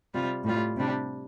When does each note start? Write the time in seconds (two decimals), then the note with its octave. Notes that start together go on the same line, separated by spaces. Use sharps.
0.14 C3 G3 F4
0.44 A2 G3 F4
0.77 C3 G3 D4